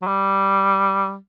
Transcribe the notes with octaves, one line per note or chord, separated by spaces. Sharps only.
F#3
G3